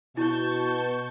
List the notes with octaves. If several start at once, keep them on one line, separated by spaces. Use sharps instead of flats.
B2 E4 A5 C#6 G6